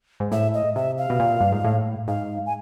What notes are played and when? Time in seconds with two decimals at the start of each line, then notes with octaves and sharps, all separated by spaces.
0.20 G#2
0.32 A2 E5
0.54 D#5
0.76 C3 E5
0.98 F5
1.10 B2
1.20 A#2
1.40 G2
1.52 G#2
1.64 A2
2.08 G#2 F5
2.46 G#5